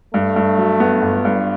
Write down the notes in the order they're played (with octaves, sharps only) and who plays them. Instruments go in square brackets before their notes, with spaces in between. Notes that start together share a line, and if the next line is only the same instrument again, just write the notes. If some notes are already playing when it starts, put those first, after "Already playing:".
[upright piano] G2 [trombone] A3
[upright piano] G2
F#3
B3
G1
G2